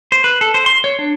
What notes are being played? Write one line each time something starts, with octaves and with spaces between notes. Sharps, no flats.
C5
B4
A4
C5
C6
C#5
D4